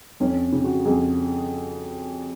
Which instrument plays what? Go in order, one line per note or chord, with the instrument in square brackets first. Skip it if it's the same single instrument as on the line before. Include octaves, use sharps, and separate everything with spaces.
[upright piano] F2 C#4
C#3
F#4
F2 G#4